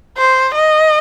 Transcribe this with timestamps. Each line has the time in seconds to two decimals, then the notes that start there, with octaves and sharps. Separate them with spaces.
0.17 C5
0.55 D#5